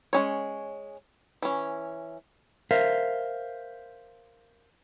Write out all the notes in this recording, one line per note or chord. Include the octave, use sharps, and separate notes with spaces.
G#3 C#4 C#5
E3 C#4
A#4 C5 E5 F5